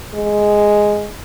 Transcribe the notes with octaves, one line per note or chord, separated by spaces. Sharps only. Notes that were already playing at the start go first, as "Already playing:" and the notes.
G#3